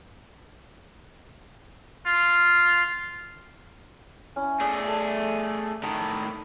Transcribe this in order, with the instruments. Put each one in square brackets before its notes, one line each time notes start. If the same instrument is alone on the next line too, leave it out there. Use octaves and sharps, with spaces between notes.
[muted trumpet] F4
[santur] C#4 E4
[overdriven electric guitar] A3 G#4 [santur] D5
[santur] A4 E5
[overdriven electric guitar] A2 D#3 [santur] D#5 A5